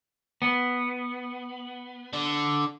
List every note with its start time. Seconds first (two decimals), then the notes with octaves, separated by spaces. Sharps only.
0.42 B3
2.13 D3